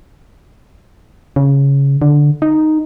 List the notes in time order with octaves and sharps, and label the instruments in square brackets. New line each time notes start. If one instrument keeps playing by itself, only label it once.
[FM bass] C#3
D3
D#4